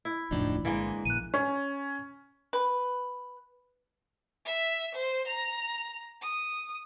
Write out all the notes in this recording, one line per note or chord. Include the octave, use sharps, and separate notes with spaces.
E4
F1 D2 A2 F3 D4 D#4
G1 D3 E3 G#3 A#3
A#1 F#6 D#7
C#4
B4
E5
C5
A#5
D#6